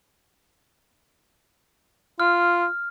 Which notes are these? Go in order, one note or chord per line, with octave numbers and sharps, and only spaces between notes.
F4 F6